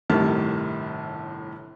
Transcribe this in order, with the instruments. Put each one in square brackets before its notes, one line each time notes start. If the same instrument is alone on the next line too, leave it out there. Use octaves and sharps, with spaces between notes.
[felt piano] G1 A2 C3 D#3 A5 F6